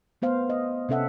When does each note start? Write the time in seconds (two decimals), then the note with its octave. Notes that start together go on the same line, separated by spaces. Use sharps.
0.22 A3 B3 C5 F5
0.49 D#5
0.89 C3 C#4 A4 E5 F#5